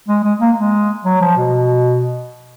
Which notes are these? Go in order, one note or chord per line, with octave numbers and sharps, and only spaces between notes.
G#3
G#3
A#3
G#3
F#3
F3
B2